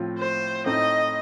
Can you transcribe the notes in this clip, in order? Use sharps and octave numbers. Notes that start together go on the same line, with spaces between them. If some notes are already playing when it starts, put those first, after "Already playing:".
Already playing: A2 F3 C4 F4
C5
A2 A3 C4 D#4 D#5